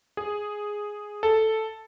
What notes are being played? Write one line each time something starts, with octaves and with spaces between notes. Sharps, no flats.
G#4
A4